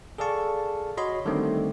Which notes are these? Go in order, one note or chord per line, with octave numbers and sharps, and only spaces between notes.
G#4 A4 D5 F5 A5 C#6
F#4 C#5 D#5 B5 C6
D3 D#3 G3 A3 C4